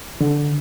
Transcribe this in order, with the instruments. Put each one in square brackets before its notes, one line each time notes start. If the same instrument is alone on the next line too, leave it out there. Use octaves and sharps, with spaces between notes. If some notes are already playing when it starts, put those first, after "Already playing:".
[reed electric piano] D3